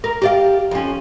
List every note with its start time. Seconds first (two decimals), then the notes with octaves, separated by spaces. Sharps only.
0.04 A#4
0.22 G4 D5 F5
0.71 F2 C#4